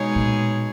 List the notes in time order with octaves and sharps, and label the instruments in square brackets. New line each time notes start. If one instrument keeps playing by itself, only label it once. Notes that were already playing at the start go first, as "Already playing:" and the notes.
Already playing: [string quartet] B2 G#3 D#4 G#4 C#5
[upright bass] A#2